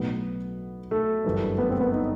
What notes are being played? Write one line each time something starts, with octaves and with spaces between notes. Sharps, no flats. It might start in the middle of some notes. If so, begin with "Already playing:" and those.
Already playing: B1 A2 F#3 B3
A3
G1 F#2 E3 G3
B3
C4
B3
D#4